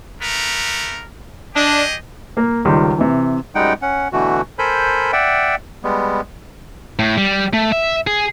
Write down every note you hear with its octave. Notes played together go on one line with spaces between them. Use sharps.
A3 B3 A#4
D4 G4 G#4 D#5
A#3 A#4
C#2 D#3 G3 F4
C3 E3
F#2 G3 G#3 D#4 F#5 G5
C#4 F#5
B2 D3 E3 A3 F#4
A4 A#4 C5 G#5 B5 G6
D5 E5 F#5 G5
G3 G#3 B3
A2
G3
A3
E5
G#4